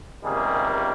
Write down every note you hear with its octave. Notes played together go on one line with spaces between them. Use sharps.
C#2 C3 D#3 G3 A#3 G#4